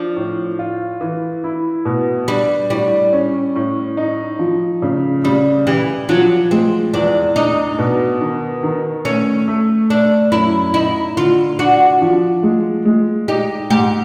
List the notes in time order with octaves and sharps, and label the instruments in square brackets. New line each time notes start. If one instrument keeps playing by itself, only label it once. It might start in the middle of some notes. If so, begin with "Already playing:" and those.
Already playing: [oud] F3 [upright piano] D4
[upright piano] A2
F4
E3
E4
B2
[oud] G3 [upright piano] D4
[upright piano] A2 [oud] G3
[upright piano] C#4
A2
D#4
F3
C#3
[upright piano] C#3 [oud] G3
[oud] E3 [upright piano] G4
[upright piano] F3 [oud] F#3
[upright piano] G#3 [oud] C4
[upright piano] E2 [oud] D4
[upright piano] D4 [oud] D#4
[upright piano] B2
D#3
D#3
[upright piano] A3 [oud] C#4
[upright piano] A3
[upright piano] A3 [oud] D4
[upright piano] F#2 [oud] E4
[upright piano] D#4 [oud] E4
[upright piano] D3 [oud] F4
[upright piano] D4 [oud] F#4
[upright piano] F3
G#3
G#3
[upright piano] D#4 [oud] G4
[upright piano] G#2 [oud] G4